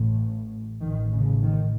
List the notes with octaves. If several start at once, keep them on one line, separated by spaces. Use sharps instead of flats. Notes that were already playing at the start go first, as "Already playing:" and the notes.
Already playing: A1 A2
A1 A2 D#3
C#3
D#3